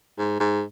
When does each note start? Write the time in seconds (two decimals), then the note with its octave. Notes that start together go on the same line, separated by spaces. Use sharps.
0.18 G#2
0.40 G#2